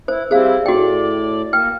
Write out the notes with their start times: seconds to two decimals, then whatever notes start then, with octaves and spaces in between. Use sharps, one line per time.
0.08 E4 C5
0.31 G3 C4 E4 G#4 C5 F5
0.66 A2 F#4 D5 G5
1.53 A#3 G5 F6